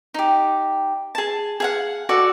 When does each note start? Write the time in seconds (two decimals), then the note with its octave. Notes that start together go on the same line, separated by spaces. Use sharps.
0.14 D#4 G4
1.15 G#4 A5
1.60 G#4 F5 F#5
2.09 F#4 A4 D5 F#5